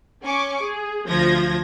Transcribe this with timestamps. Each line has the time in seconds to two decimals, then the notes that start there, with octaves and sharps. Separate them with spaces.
0.24 C#4 G#5 C#6 D6
0.62 G#4
1.08 D2 F3 G6 G#6 A#6